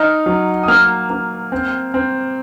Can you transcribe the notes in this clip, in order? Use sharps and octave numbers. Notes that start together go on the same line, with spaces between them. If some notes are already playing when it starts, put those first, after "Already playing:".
Already playing: D#4 F6
F#3
D#6
A#3 F6
A#3
C4
C4